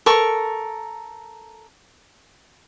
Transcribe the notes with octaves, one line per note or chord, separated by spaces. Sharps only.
A4 A#4 C#6